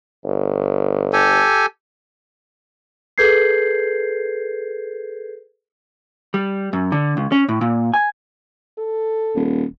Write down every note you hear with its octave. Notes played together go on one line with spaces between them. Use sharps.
G1
G4 A4 G#5
G#4 A4 B4 G6 G#6 C7
G3
F#2
D3
C#2
C#4
A2
A#2
G#5
A4
D#1